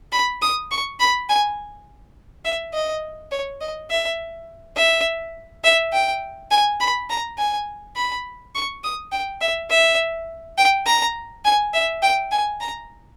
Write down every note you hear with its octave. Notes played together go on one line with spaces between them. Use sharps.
B5
D#6
C#6
B5
G#5
E5
D#5
C#5
D#5
E5
E5
E5
G5
G#5
B5
A#5
G#5
B5
C#6
D#6
G5
E5
E5
G5
A#5
G#5
E5
G5
G#5
A#5